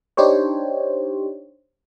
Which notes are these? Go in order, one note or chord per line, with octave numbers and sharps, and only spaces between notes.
D4 D#4 G4 C5 C#5